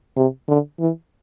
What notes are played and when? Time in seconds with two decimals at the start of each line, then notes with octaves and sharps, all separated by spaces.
0.17 C3
0.48 D3
0.80 E3